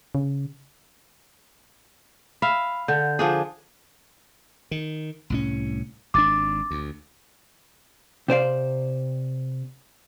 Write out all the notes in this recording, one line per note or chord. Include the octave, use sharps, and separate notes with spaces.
C#3
E5 F5 B5
D3 F#5 G6
F3 D4 G#4
D#3
C2 A2 C#4
G#1 D4 D6 A6
D2
C3 C5 D5 F5